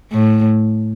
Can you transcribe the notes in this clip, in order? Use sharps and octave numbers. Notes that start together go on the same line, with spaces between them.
A2